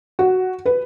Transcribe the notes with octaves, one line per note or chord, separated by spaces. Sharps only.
F#4
B4